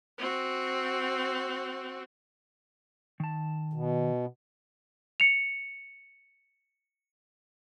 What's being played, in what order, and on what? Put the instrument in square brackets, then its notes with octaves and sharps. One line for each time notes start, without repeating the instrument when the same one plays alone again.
[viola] C4 F#4
[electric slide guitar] D#3 A5
[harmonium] B2
[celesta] C#7 F7